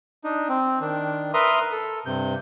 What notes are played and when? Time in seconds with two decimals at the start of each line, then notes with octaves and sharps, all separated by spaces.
0.24 D4 D#4
0.49 C4
0.81 D#3 D4
1.34 A#4 B4 E5 A#5 C6 D#6
1.72 A4
2.06 G2 C3 G6